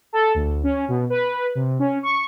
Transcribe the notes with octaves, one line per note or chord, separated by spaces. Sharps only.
A4
D2
C#4
B2
B4
C3
C#4
C#6